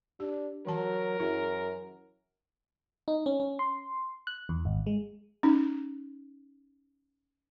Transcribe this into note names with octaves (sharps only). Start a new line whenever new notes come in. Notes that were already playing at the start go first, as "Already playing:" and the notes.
D4 G4
E3 F#3 A#4 A5
F#2 E4 G#4
D#4
C#4
C#4
C6
F#6
E2
G#1
G#3
C#4 D#4